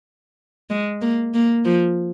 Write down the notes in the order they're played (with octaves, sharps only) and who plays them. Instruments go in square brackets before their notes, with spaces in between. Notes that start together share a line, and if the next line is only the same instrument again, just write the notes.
[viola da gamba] G#3
A#3
A#3
F3